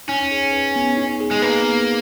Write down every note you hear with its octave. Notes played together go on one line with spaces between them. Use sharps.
C#4 D#4
G#4
B4
B3
D#4
G#4
G#3
A#3 B4
B3